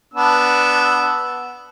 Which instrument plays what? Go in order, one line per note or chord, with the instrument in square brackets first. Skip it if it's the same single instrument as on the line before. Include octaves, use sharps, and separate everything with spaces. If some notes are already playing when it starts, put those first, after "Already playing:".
[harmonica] B3 D4 E6